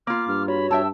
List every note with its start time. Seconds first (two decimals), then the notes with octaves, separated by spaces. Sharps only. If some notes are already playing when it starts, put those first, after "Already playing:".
0.07 A#3 F4 D6 F6
0.28 G2 F6
0.48 F#4 C#5 B5
0.71 G2 E5 G5 A5 E6